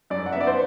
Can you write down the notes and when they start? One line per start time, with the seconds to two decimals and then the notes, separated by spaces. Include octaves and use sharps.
0.10 F#2 D5
0.26 F#5
0.32 E5
0.35 B3
0.41 D5
0.47 C5